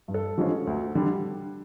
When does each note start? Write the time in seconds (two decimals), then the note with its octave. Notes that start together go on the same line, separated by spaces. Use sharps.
0.08 G2
0.14 A4
0.38 D3 F3 G#3 C#4
0.67 D2
0.95 D3 G3